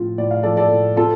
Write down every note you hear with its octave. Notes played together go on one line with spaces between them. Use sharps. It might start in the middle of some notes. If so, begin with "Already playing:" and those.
Already playing: A2 F3 C4 F4
A2 D5
F5
F3 A4 D5
A4 D5
A2
C4 F4 A4